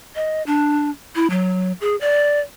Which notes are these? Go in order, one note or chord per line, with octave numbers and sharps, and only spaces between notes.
D#5
D4
E4
F#3
G#4
D5